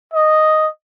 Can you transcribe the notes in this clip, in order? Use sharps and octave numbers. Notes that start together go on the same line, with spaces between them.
D#5